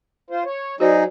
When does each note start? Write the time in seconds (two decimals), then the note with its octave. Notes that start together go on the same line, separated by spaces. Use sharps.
0.30 F4 C5
0.45 C#5
0.80 F#3 D#4 F#4 G#4 C5 D5